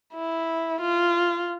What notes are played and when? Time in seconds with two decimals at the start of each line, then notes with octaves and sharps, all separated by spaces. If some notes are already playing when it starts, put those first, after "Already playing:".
0.14 E4
0.81 F4